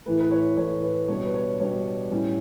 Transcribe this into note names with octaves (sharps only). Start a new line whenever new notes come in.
A2 E3 A3 B4
B4
C#5
A2 E3 A3 C#5
B4
B2 G3 B3 D4 C#5
B4
C#5
B2 G3 B3 D4 C#5
A2 G3 C#4